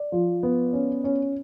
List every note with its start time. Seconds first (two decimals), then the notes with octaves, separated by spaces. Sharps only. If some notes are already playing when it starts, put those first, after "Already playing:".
Already playing: D5
0.12 F3
0.43 B3
0.73 C#4
1.04 C#4